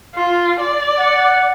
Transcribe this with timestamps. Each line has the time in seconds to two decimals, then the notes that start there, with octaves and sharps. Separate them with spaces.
0.15 F4
0.60 D5
0.98 F#5